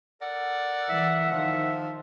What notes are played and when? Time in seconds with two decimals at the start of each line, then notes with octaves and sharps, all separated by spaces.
0.21 A4 A#4 D5 F#5
0.90 E3 E5
1.31 D#3 F3 E5